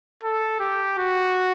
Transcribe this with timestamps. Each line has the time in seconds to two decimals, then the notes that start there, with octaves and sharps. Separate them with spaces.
0.23 A4
0.60 G4
0.98 F#4